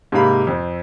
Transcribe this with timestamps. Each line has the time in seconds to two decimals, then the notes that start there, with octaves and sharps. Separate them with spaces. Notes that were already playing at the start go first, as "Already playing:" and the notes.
0.12 G#2 C3 A#3 F5 B5
0.47 F2 C4